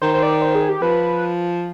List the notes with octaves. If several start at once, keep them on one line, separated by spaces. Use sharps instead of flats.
D#3 C5
C5
D5
C5
G#4
G4
F3 B4